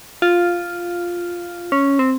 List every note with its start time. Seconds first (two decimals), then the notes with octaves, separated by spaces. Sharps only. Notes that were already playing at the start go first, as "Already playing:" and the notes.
0.22 F4
1.72 C#4
1.99 C4